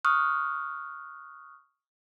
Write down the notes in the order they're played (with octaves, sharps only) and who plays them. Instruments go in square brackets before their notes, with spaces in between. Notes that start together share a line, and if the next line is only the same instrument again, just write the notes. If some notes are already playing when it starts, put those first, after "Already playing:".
[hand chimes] C#6 D#6 F6 F#6